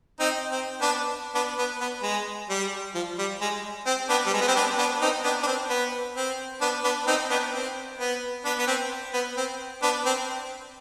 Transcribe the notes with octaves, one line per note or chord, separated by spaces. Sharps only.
C4 D#4
C4
B3 D4
B3 D4
B3
B3
G#3
G3
F3
G3
G#3
C4
B3 D4
G3
G#3
B3
C4
B3 D4
B3 D4
C4 D#4
B3 D4
D4
C4
B3
C4
B3 D4
B3 D4
C4 D#4
B3 D4
C4
B3
B3 D4
B3
C4
B3
C4
B3 D4
C4